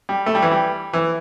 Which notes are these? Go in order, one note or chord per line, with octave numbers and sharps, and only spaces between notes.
G3
A3
G3
E3
G3
E3